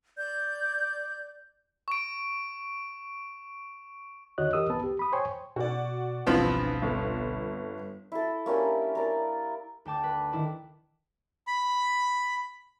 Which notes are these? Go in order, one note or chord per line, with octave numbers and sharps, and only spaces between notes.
D5 G6
C#6 D7
D#2 D3 F#4 C#5 D#5 F#6
E3 G4 A#4 D#5 D#6 E6
C2 B3 B4 A5
G4
B5 D#6
C5 C#5 G5 G#5 C6 C#6
B2 F#4 D5
G#1 C#2 G2 B2 E3 F3 B3 C4
G1
E4 A4
A#3 C#4 D4 G4
A#4 D5
D2 G5 A5 D6
B4
D#3 E4 D6
B5